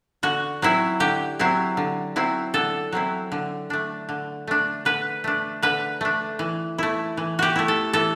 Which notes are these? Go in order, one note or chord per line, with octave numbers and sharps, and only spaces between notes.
D3 F#4
F#3 C4 E4
D3 G4
F#3 C4 E4
D3
F#3 C4 E4
D3 A4
F#3 C4 E4
D3
A3 D4
D3
A3 D4
D3 B4
A3 D4
D3 B4
A3 D4
E3
A3 E4
E3
F#4 G4
A3 E4
A4
E3 A4